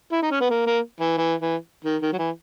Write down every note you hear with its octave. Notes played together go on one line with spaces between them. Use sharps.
E4
D#4
C#4
B3
A#3
A#3
E3
E3
E3
D#3
D#3
F#3
E3